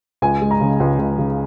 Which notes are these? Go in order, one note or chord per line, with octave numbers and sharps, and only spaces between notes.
C#2 G#5
G#3
A#5
C#3
C#2
C#2
C#3